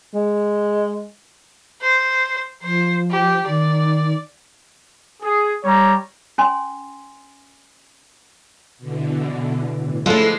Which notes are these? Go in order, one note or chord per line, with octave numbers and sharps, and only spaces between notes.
G#3
C5
F3 C5
G4
D#3 D5
G#4
G3 C#5 A#5
C#4 G#5 C6
B2 D3 E3
A2 E3
F3 G#3 A3 E4 F4 D6 E6